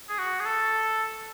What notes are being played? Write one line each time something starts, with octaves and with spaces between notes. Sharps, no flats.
G#4
F#4
G#4
A4